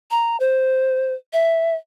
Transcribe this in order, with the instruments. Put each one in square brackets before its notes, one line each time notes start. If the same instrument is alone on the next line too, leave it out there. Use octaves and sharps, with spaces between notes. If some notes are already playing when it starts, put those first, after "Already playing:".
[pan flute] A#5
C5
E5